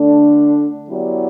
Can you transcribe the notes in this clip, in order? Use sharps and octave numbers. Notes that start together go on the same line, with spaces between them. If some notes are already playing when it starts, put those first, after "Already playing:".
Already playing: D3 A3 D4 A4
F#3 B3 E4 G4 D5